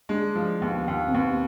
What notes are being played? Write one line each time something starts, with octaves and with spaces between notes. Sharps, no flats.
G#3 D4
F3
D#2 B3
D#2
C4
D#2 B3